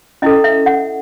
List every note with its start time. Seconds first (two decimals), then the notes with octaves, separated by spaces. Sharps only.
0.22 C#4 E4 A4 D#5
0.44 E5
0.66 F#5